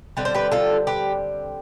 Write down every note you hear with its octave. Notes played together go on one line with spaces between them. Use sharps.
D3 G3 C4 B4
C5
G4 B4
F4 A4
G4 B4